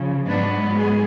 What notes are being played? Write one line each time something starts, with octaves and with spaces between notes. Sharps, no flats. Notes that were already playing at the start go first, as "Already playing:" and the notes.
Already playing: C#3 F3
G#2 F#3 B3 D4
G#4